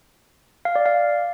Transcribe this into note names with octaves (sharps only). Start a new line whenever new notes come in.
F5
D5
F5